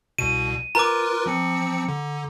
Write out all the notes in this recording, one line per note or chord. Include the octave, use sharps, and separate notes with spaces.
C2 B2 D#7
F4 A#4 B4 A#5 D6
F3 C4 C#7
D3